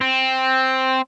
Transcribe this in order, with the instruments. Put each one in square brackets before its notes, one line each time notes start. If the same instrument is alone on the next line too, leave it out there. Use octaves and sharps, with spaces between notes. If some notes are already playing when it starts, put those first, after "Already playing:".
[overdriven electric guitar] C4